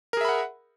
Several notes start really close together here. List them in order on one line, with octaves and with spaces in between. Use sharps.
A#4 G#4 E5 B5 F#5